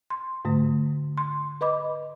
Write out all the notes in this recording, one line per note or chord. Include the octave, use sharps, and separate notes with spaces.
C6
G#2 D3 A3
C6
B4 D#5 B5 D6